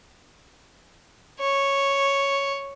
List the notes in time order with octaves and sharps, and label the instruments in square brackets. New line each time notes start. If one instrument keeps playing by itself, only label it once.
[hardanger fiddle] C#5